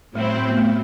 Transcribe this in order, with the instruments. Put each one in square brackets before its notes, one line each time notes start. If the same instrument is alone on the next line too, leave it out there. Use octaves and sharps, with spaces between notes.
[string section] A2 F#3 C4 E4 [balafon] A3
[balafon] B3
A3